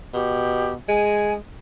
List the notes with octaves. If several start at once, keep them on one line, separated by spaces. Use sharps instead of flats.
B2 G4
G#3 G#5